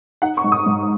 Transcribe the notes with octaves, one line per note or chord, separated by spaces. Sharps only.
D#4 F#5
C#6
G#2
D#6
G#2